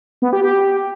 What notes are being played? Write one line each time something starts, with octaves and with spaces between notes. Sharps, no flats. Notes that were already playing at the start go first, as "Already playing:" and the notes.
B3
G4
G4